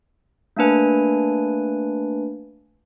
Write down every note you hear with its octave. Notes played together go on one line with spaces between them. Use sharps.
A3 A#3 D4 B4 G#5